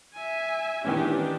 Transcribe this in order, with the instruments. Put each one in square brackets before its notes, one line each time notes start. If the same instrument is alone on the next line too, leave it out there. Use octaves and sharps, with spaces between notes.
[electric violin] E5 G#5
[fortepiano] D#3 E3 C#4 [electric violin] D4 G4